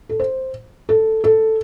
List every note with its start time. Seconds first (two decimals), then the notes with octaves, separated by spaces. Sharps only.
0.09 A4
0.20 C5
0.89 A4
1.24 A4